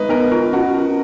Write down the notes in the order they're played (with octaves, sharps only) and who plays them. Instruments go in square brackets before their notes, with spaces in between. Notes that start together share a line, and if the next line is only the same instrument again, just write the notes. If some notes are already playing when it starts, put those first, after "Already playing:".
Already playing: [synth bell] G#3 [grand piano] D#4 B4
[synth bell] B3 [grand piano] A#4
[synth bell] F4 [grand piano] A#4
[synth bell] C#4 [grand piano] F#4
[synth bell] C#4